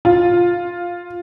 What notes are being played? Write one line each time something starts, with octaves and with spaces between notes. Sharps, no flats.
F4